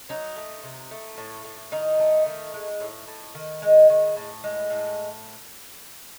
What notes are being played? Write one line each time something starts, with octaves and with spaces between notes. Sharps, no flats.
F#3 D#4
A3
C3
A3
A2
A2
D#3 D#4
A3
D#3
G#3
A2
A2
D#3
G#3
D#3
A2
G#3
A2